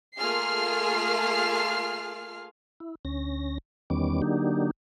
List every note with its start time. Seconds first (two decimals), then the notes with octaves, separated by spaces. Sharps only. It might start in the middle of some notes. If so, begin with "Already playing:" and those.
0.18 A3 A#3 F4 G#4 F6 C7
2.80 E4
3.05 D2 C#4 A#6
3.90 E2 D#3 G3 B3 C#4 D6
4.22 D3 F#3 A#3 D4 D#4 G4